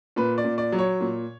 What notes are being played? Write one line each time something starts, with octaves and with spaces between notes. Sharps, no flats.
A#2 B4
D5
A#2
D5
F#3
C#5
A#2